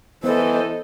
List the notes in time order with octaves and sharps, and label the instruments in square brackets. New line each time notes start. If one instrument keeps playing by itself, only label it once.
[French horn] E3 [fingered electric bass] B3 [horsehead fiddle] A4 D#5 [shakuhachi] C5